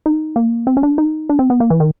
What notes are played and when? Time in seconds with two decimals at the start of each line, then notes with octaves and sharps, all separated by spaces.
0.06 D#4
0.36 A#3
0.67 C4
0.77 C#4
0.83 D4
0.98 D#4
1.29 D4
1.39 C4
1.50 B3
1.60 A#3
1.70 E3
1.80 D#3